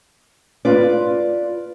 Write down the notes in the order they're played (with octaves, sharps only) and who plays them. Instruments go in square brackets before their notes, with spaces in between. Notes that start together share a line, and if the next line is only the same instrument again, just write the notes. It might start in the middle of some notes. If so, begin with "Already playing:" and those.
[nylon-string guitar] F4 B4 D5